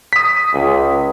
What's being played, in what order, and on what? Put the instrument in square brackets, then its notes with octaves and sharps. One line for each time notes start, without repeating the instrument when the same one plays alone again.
[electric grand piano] D#6 B6
[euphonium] C#2